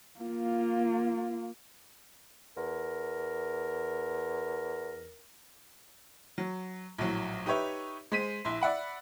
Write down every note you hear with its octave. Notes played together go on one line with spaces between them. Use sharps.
A#3 F4
E2 A#4
F#3
A#1 A2 F#3
D#4 G4 B4 C#5 E5
G#3 C5 B6 D#7
A#1 E4 C6
D5 E5 F#5 B5